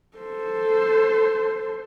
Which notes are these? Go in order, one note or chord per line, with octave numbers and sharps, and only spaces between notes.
A4 C5